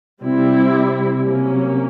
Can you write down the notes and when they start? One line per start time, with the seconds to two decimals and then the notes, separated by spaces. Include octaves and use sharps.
0.22 C3 G3 C4 E4
1.22 F#3 A#3 C#4